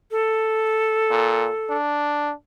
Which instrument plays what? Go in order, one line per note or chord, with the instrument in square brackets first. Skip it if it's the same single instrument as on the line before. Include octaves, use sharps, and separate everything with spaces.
[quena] A4
[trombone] A#2
D4